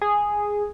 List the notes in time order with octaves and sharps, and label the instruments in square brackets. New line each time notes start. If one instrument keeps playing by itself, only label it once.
[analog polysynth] G#4